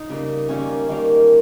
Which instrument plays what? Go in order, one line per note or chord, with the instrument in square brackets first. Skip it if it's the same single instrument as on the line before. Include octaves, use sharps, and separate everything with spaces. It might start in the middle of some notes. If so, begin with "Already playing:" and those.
Already playing: [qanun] D#4
C#3 G3 A#3
D#3 G3 A#3 C#4
D#3 G3 A#3